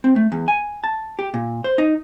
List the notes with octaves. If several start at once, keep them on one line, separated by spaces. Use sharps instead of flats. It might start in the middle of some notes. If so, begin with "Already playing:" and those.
C4
A3
E2
G#5
A5
G4
A#2
C5
D#4